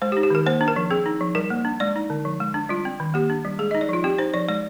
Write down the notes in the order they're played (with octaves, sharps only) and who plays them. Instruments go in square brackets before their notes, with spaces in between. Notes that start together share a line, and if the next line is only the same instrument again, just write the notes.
[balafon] G#3 C5
G4
D#4
G4
D#3 A#4
A#3 C5
D4
A#4
F3
C4 G#4
D#4
F3
G3 A#4
A#3
D4
G#3 D5
D#4
D3
F3
G#3
D4
G3 F4
C4
D#3
A#3 G4
D4
G3
G#3 G#4
D#4 D#5
D5
F3 F4
C4 G4
D#4 C5
F3 D5
G#3 D5